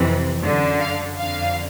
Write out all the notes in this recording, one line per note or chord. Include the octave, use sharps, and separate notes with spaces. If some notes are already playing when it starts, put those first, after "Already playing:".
Already playing: F2 C3 E3
F#2 D3
F5
F2 D3 F5